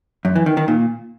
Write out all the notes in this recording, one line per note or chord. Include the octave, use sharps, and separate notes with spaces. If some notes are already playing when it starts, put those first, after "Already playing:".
F#2
E3
D#3
D#3
A#2